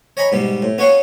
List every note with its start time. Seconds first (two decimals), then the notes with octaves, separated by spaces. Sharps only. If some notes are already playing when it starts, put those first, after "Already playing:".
0.17 C#5 D#5 G#5 A#5 B5
0.32 G#2 B2 G3
0.62 A2
0.78 B3 C#4 F#4 C#5 F5